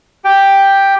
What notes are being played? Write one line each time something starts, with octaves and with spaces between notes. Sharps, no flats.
G4 G5